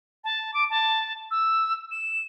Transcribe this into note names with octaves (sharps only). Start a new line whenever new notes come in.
A5
D6
A5
E6
E7